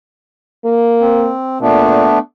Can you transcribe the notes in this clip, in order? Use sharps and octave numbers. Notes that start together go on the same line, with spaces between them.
A#3
C4
A#2 A3 B3 D4